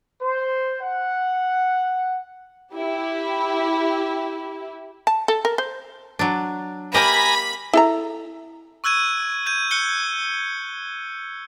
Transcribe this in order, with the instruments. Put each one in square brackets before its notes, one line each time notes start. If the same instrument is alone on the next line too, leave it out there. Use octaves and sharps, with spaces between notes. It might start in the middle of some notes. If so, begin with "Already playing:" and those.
[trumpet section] C5
F#5
[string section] E4 G4
[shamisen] A5
A4
A#4
C5
[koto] F#3 D4
[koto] A#3 G4 D#5 [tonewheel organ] G#5 A#5 A#6 [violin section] B5
[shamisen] E4 A4 A#5
[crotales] C#6 E6 F#6 G#6 D#7
G6 G#6 D#7
F#6 G6 C#7 G7